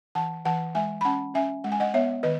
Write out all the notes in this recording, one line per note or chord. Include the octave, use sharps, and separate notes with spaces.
E3 F#5 A5
E3 F#5 A5
G#3 E5 G#5
B5
C#4 F#5 A5
C#4 E5 G#5
G#3 F#5
G#5
D#5 F#5
B3 C#5 E5
D#3 B4 D#5